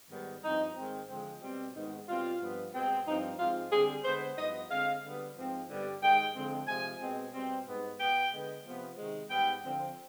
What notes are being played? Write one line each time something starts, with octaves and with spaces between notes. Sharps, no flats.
G#2 D#3 G3 B3
G2 F3 C4 D#4
G#2 D#3 G#3 C4
D3 F3 G#3 C4
B2 G3 C4
G#2 D#3 G#3 B3 D#4
B2 G3 C4 F4
G2 F3 B3
B2 G#3 C4
G2 F3 C4 D#4
G#2 F3 C4 F4
D3 G3 C4 G#4
D3 G#3 B3 C5
G2 F3 B3 D#5
D3 G#3 C4 F5
D3 G3 B3
G#2 F3 C4
G2 D3 G3 B3
G#2 D#3 G#3 G5
D3 F3 G#3 C4
C3 F3 G#3 G#5
B2 G#3 C4
B2 G3 C4
G#2 G3 B3
B2 B3 G5
D3 G#3 B3
C3 F3 B3
C3 D#3 G#3
G#2 G3 B3 G5
D3 F3 C4